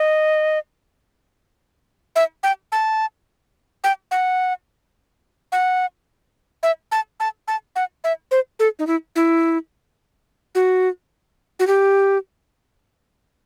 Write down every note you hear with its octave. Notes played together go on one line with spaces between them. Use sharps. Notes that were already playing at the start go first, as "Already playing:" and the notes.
Already playing: D#5
E5
G5
A5
G5
F#5
F#5
E5
A5
A5
A5
F#5
E5
C5
A4
D#4
E4
E4
F#4
F#4
G4